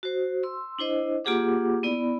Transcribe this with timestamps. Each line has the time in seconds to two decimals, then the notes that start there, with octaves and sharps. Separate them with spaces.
0.03 F#4 C5
0.43 C6 E6
0.79 D4 E4 C5 D#5
1.25 A#3 F4 G4 G#4 F#5 D6
1.83 B3 E4 D5 B5